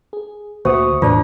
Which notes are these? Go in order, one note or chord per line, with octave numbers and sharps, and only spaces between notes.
G#4
D2 A#2 A#3 F#4 C5 E5 C#6 D#6
E1 A2 D3 E3 D4 F4 D5 A5